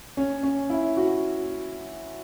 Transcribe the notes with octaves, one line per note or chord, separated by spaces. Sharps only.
C#4
C#4
E4
F#4